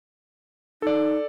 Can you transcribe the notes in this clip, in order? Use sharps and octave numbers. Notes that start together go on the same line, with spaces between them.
D#4 A4 D5